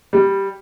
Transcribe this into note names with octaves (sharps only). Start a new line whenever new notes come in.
G3